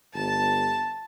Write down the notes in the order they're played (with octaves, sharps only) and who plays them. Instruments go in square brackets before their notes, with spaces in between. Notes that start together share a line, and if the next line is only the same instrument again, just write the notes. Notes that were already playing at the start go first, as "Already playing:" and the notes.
[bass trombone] G1 [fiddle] A5